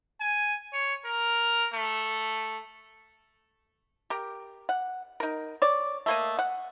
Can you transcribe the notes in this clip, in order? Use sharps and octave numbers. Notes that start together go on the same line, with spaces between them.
G#5
C#5
A#4
A3
G4 A#4
F#5
D#4 A#4
C#5 D5
A3 A#3 D#5
F#5